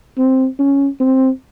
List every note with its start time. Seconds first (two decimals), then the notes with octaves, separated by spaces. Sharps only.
0.18 C4
0.59 C#4
1.00 C4